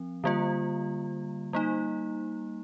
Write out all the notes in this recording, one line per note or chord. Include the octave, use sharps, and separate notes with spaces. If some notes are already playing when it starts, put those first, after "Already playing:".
Already playing: F3 C4
D3 G3 A#3 F4
G3 A#3 D#4